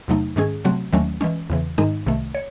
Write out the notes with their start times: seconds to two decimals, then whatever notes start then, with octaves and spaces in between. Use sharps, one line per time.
0.08 E2 C3 F#3 A3 D#4
0.36 G#2 D#3 G#3 C#4 G#4
0.65 C3 F#3 A3 C4 F#4
0.93 D#2 D#3 F#3 A3 C#4
1.21 E3 G#3 C#4
1.50 E2 C#3 E3
1.78 G#2 D#3 G#3 D#4
2.06 C2 C3 D#3 A3
2.35 C#5